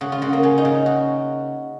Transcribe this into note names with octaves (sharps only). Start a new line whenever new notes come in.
C#3 F#4
F4
C#3 F#4
A#3
C#3 C#4
D#4
C#3
F#4